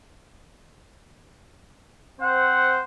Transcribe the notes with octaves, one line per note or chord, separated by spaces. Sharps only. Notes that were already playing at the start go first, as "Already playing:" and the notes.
C4 C5 F#5